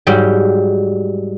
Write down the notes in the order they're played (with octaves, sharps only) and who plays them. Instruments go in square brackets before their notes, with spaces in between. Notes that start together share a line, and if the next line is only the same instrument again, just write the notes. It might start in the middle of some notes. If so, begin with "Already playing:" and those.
[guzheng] G#2 F#3 G3